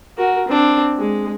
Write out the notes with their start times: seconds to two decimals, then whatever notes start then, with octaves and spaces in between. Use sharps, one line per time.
0.17 F#4 A#4
0.48 C4 D4
0.98 G#3